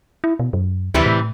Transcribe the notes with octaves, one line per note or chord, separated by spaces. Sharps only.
E4
B2
F#2
D2 C3 E3 G3
A2